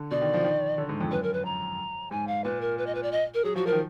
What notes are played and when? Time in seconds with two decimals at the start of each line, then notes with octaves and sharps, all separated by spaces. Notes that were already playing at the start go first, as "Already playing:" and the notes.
Already playing: D3
0.11 B2 D5
0.22 D#3
0.34 F3
0.44 D#3
0.78 D3
0.89 G#2
1.01 F2
1.11 F#2 B4
1.23 A#4
1.33 B4
1.45 A#5
2.11 G#2 G#5
2.27 F5
2.44 A#2 B4
2.61 A#4
2.78 B4
2.86 D#5
2.95 B4
3.03 D5
3.12 D#5
3.34 A#4
3.44 F#3 G#4
3.55 F3 F#4
3.66 F3 A#4
3.72 D#3